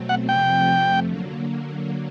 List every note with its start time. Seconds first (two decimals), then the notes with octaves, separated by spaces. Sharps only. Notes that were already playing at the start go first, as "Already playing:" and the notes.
Already playing: B2 F#3 A3 C4
0.09 F#5
0.29 F2 C3 F3 A3 G5
1.07 D3 F#3 A#3